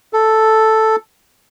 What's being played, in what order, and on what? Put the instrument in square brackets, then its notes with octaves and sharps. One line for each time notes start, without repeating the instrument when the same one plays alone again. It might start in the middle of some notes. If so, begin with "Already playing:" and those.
[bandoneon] A4